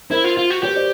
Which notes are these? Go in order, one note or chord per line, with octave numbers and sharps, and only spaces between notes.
E4 A#4 C5
F4
F4
F#4
G4 B4 C#5
C5 D5